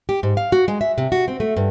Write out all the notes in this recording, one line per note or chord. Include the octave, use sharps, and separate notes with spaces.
G4
G#2
F5
F#4
G#3
E5
C3
F#4
C4
A3
G2